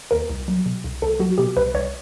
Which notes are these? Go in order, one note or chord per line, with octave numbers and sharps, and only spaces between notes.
D#2 A#4
C2
F#3
B2
C2
C2 A4
F#3 F#4
B2 G4
C2 B4
C2 C#5